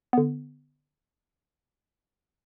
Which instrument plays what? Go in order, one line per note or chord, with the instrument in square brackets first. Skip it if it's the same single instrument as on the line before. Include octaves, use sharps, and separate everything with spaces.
[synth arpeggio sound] D3 B3